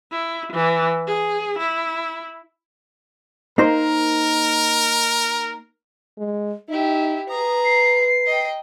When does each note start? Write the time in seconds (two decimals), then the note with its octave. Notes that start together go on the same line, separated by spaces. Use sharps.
0.12 E4
0.53 E3
1.07 G#4
1.59 E4
3.58 A#3 D#4 A#4 C5
6.18 G#3
6.69 D#4 E4 G4 E5
7.29 G#4 B4 A#5 D#6
7.64 C7
8.26 D#5 G5